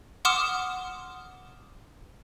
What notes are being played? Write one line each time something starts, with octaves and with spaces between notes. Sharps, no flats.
F#5 C6 D6 D#6 F6 E7